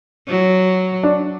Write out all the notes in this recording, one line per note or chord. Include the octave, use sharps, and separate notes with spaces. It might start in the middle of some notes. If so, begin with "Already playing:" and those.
F#3
D4